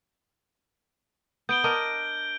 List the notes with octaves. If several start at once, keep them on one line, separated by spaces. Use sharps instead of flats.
B3 G6 D7 G7
D4 A#4 D#5